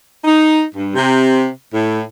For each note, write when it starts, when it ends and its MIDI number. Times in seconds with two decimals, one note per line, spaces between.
0.24 0.63 63
0.75 0.90 43
0.94 1.49 48
1.74 2.02 45